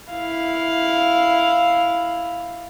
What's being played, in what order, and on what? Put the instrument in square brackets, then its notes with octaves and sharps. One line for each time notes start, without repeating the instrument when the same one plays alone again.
[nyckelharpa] E4 F5